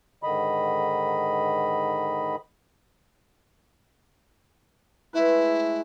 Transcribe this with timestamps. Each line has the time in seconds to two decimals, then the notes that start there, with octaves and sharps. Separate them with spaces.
0.23 G#2 D3 D#3 D#5 B5
5.13 G#3 A3 E4 B4